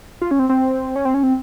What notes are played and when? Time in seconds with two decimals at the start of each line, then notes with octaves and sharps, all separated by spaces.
0.22 F4
0.31 C#4
0.39 C4
0.49 C4
0.96 C#4
1.05 C4
1.14 C#4
1.23 C4